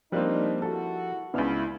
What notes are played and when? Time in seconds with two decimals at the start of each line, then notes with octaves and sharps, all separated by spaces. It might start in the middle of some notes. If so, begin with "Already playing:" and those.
0.12 F3 G3 A#3 C4 D4 D#4 G4 F#6
0.62 E4 F#4 A4
1.34 C#2 C#3 B3 D4 E4 F6